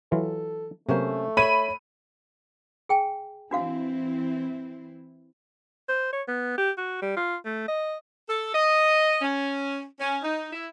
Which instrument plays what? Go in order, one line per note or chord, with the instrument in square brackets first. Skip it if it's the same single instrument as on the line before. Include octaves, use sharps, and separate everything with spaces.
[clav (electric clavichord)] E3 F#3 F4 [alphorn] A4
[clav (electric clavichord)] C3 F#3 A#3 [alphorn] A3 [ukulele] C#4 C5
[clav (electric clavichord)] A4 [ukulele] C#5 E5 [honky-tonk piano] B5 D#7
[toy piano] G#4 G5 G#5
[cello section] E3 C4 E4 [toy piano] D4 F#4 F5
[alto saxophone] C5
C#5
B3
G4
F#4
G3
F4
A3
D#5
[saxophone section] A4
D#5
C#4
C#4
D#4
E4